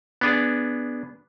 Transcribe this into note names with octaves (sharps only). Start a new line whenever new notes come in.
B3 D4 G#4